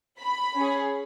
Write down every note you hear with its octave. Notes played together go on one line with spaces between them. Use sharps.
B5
C#4 G#4